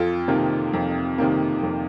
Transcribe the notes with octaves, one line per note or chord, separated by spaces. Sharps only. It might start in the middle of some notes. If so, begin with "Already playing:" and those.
Already playing: F2 F4 A4
C3 D#3 A#3
F2
C3 D#3 A#3
F2